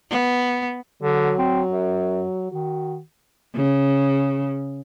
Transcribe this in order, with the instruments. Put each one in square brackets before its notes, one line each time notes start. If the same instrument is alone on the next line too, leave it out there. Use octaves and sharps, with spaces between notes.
[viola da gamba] B3
[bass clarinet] D3 [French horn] F#3
[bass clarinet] C4
F#2
[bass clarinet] D#3 [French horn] F#4
[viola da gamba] C#3